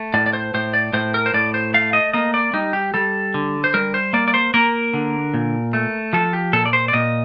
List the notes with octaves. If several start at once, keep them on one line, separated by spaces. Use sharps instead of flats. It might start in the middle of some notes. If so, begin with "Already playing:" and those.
Already playing: A3
A2 D5
D5
C5
A2 C5
D5
A2 C5
A#4
C5
A2 D5
C5
A3 F5
D#5
A#3 D#5
D5
G3 D#4
G4
G3 A4
D3
C5
G3 A#4
C5
A#3 D5
D5
C5
A#3 A#4
D3
A#2
A3
F3 A4
G4
A#2 A4
D5
C5
D5
A#2 D#5